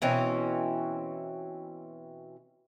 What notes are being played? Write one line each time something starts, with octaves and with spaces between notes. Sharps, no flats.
B2 E3 C4 C#4